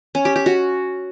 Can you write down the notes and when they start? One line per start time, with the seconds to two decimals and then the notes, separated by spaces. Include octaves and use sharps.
0.15 C#4
0.25 G4
0.36 G4
0.46 F#4